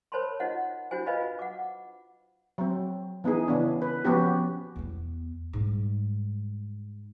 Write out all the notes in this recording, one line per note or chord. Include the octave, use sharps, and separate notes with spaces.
A#4 C5 C#5 A5 B5 C6
D#4 F4 C5 D#5 F#5
D4 E4 F#4 C5 G#5
F4 B4 C5 D#5 F5 B5
F#5 D6
F#3 C4
E3 B3 D#4 G#4
C#3 E3 B3 D4 C#5
B4
F3 B3 C#4 F#4 G4
E2 B3
G#2 G3